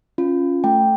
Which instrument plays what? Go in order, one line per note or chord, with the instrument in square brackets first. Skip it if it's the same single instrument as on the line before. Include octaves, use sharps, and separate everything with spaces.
[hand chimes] C#4 F4
A3 G5